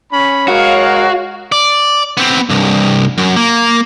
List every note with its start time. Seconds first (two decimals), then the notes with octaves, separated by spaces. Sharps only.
0.11 C#4 B5
0.48 G#3 F#4 A#4 C#5 F5
1.52 D5
2.17 B3 C4
2.50 C2 G2
3.18 F#2
3.36 A#3